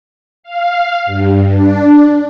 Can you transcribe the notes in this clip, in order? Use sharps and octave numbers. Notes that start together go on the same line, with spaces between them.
F5
G2
D4